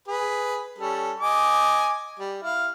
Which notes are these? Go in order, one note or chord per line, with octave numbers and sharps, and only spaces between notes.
G#4 B4
G3 C#4 A4
D#5 G#5 D6
G3
E4 F5